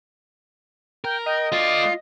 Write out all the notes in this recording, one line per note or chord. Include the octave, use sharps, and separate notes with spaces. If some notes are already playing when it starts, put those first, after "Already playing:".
A#4 G5
D#5 G5
A3 F4 D5 C7